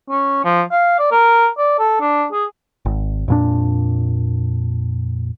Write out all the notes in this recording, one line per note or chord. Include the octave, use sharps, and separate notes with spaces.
C#4
F3
F5
D5
A#4
D5
A4
D4
G#4
G#1
F2 A#2 D4